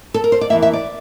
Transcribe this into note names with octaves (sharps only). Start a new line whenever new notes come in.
A4
A#4
C5
D5
F2 E3 A#3 E5
E5
D5